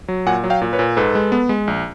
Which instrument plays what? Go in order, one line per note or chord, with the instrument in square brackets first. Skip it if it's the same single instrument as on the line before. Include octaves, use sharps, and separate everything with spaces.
[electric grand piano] F#3
A#2 F#5 G#5
F#3
F5 G5
A#2
B4 C#5
A#2
G#2 A4 B4
G#3
B3
G#3
A#1